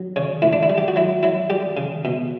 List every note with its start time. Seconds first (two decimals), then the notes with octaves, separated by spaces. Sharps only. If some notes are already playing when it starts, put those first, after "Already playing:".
Already playing: F#3
0.16 C#3 C#5
0.42 A2 E4
0.53 D4
0.63 E4
0.70 G3
0.78 G4
0.88 F#4
0.96 F#3 E4
1.23 F#3 E4
1.50 G3 G4
1.77 C#3
2.05 B2